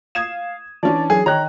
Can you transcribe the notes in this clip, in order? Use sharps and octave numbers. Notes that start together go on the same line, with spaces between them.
F5 D#6 G#6 E7
E3 C#4 D4 D5 A5
F#3 G#4 G#5
D#3 C#5 D#5 G5 A#5 F#6